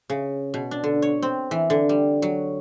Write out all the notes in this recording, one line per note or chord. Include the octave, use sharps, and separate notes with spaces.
C#3
B2
D4
D3
C#5
C4
E3
D3
G3
F#3